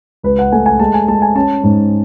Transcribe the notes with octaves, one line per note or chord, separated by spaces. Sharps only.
C#2 B4
F#5
A3 G#5
G#5
G#3 A5
G#5
G#3 A5
G#5
C#4 A5
G#2